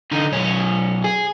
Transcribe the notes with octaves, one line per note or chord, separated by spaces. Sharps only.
D3 D#4
B1 C#4
G#4